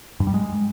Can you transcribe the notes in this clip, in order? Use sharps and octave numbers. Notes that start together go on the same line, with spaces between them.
G2
G3
G#3